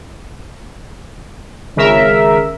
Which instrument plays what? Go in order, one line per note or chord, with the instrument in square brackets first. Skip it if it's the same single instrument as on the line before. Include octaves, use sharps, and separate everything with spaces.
[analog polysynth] G#1 C#3 A#4 E5